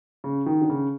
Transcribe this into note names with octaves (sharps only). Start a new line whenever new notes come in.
C#3
D#3
D3
C#3